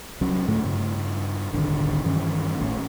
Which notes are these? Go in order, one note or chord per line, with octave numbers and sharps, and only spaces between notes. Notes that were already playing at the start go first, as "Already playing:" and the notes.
C2 F#3 C#4
D2 G#2 A3
G2 C#3
D#1 G#1 D3 D#3
G2 D#3 E3 C#4
G#1 A2 C#3 C#4